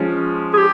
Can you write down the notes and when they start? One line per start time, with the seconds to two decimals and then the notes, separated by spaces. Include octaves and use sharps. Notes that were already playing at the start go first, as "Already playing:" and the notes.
Already playing: F3 G#3 C#4
0.54 G#4
0.58 G4